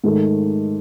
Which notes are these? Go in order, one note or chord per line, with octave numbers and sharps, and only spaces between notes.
G#2 D#3 A3 D#4